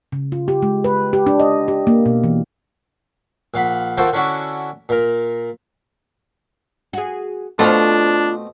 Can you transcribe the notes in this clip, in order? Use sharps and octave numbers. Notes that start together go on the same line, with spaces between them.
C#3
F4
G4
G#3
B4
G4
D4
D#5
G4
A#3
B2
E3
A#1 F5 F#5 B5
D#3 F3 F#4 A4 C5 G5
D3 C#4 D4 E4 F#4
A#2 A#4
F#4 G#4
B2 A3 C4 D4 F4 B4 F5